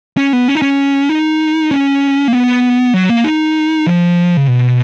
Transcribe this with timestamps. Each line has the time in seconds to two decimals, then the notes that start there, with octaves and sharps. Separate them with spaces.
0.17 C#4
0.33 B3
0.48 C#4
0.55 D#4
0.62 C#4
1.09 D#4
1.71 C#4
2.28 A#3
2.33 B3
2.94 F#3
3.09 A#3
3.24 D#4
3.87 F3
4.37 C#3
4.48 B2